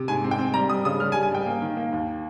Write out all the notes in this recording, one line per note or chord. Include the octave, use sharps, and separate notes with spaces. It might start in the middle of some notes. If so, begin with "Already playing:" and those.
Already playing: C3
G#2 G#5
C4
G5
C4
G3 A#5
G3 D#6
C#3 D#6
G3 F6
G#5
G3
G#5
G3 G5
A#3
D#3
A#3
D#2